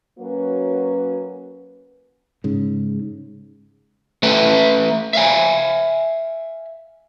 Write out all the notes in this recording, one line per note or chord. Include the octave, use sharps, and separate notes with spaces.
F#3 A#3 C#4 F#4 B4
G#2 C#3
A3 A4 B4 E5 G5 A5
E5 F5 G#5